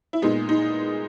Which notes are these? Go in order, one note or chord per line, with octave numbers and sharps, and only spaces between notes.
E4
A#2 G#3 B3 D#4
D#4